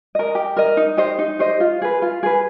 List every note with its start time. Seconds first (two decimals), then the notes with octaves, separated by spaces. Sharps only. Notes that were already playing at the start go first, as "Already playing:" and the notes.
0.15 A#4 D#5
0.35 G4
0.57 A#4 D#5
0.77 D#4
0.97 G4 C5 D#5
1.19 D#4
1.39 G4 C5 D#5
1.60 F4
1.82 G#4 B4
2.02 F4
2.23 G#4 B4